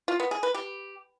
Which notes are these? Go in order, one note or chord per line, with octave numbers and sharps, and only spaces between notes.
F4
B3
G#4
B4
G4